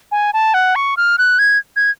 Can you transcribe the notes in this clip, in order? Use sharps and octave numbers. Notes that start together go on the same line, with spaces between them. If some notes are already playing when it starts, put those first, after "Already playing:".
G#5
A5
F#5
C#6
F6
F#6
G#6
G#6